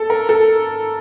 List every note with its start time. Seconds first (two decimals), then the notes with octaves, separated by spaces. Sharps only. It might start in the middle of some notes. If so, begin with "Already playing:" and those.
Already playing: A4
0.10 A#4
0.29 A4